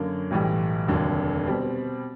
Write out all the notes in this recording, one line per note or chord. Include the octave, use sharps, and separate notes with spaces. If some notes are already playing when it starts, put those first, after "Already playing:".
Already playing: F#2 D3 F#3 A#3
B1 A2 E3 G3
F1 D#2 D3 F#3
B2 G3 C4